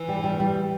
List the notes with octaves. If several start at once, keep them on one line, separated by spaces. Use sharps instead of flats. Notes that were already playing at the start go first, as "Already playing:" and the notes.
Already playing: E3
G3
G3
G3